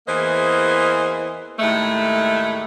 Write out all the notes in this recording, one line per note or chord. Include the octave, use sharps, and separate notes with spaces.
E2 E3 A#3 G#4 C5 D#5
D#2 A2 G#3 A3